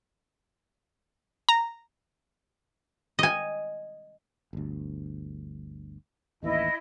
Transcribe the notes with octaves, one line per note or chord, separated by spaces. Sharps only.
A#5
D#5 G#5
G1 D2
A1 D#2 E3 E4 D#5